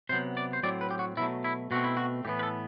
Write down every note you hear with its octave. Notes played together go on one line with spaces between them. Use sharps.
C3 F#3 B3 C5
D5
C5
A2 F#3 C4 D5
B4
G4
F#4
B2 F#3 A3 E4
E4
B2 A3 C4 F#4
E4
F#4
A2 E3 B3 G4
B4
A4